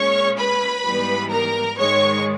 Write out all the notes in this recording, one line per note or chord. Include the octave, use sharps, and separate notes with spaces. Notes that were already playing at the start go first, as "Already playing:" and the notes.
Already playing: A#2 G#3 C#4 C#5 C#6
B4 B5
G#2 E3 G3 B3
A#4 A#5
G#2 D#3 G#3 C#5 C#6